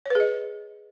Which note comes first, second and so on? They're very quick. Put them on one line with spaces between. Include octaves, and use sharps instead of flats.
C#5 B4 G#4 D#5